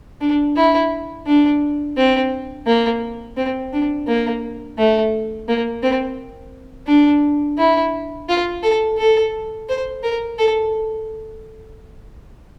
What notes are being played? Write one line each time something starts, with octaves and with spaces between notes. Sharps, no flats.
D4
E4
D4
C4
A#3
C4
D4
A#3
A3
A#3
C4
D4
E4
F4
A4
A4
C5
A#4
A4